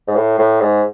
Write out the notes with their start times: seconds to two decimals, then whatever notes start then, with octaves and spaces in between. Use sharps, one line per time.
0.08 G#2
0.16 A2
0.39 A2
0.61 G#2